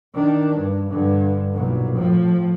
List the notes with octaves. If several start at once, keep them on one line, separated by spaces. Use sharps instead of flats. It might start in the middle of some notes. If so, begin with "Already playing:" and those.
D#3 D4
G2
G2 D3
B1 A#2
A2 F3